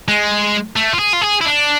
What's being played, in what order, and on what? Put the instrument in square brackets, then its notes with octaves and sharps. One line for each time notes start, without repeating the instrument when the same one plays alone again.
[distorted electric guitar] G#3
A3
F4
G#4
F4
G#4
E4
D4